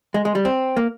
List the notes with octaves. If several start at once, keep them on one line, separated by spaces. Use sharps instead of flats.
G#3
G#3
G3
C4
A#3